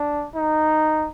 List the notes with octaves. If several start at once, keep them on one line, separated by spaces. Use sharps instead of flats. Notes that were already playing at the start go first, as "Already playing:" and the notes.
Already playing: D4
D#4